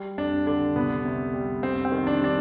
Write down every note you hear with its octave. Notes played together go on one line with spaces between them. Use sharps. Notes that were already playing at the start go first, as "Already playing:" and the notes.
Already playing: G3
F2 D4
D3 D4
C2 B3
C3
G3
F2 C4
C4
D#3
D4
G3 D4